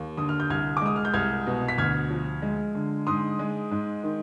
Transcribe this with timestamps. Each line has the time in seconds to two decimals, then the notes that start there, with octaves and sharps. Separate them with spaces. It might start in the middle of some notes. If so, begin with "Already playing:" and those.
Already playing: D#2
0.17 D3 D#6
0.29 F6
0.40 G6
0.50 C2 F6 G#6
0.77 D6
0.82 G#3 D#6
0.96 F6
1.05 G6
1.14 C2 F6 G#6
1.47 B2
1.68 B6
1.78 D2 F6 G#6
2.10 F3
2.42 G#3
2.75 D3
3.07 G#2 C6 D#6
3.39 G#3
3.71 G#2
4.04 D#3